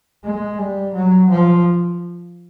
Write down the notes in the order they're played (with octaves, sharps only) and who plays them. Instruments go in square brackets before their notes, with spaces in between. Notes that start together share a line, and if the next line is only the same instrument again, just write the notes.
[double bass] G#3
G3
F#3
F3